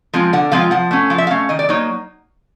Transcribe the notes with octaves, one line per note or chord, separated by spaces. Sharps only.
F3 G#3 C4 F4
D3 F#5
F3 G#3 C4 F4 F5
F3 F#5
A3 C#4
F3 F5
E5
A3 C#4 F5
D#3 D#5
D5
F#3 A#3 D#4 C#5